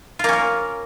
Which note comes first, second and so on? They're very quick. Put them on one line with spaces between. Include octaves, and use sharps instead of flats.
F4 A#3 C#4 A#4